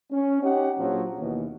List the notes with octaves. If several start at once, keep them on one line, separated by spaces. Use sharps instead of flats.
C#4
C#4 D#4 G4 C#5 F#5
A#1 F3 F#3
D#2 B2 E3